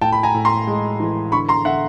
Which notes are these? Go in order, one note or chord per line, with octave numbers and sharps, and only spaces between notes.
A2 G5 A5
B5
G#5 A#5
A2
A#5 C6
G#3
E3
D3 B5 C#6
A#5 C6
D3 E5 F#5